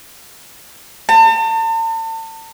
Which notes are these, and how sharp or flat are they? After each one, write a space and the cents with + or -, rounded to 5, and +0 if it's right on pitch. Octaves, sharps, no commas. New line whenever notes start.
A5 +40